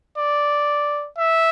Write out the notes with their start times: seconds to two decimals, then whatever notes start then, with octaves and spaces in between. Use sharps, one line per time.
0.18 D5
1.18 E5